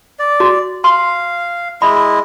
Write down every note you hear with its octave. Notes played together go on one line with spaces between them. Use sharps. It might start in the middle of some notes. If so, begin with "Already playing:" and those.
D5
F#4
F5 C6
G#3 E4 D#5 B5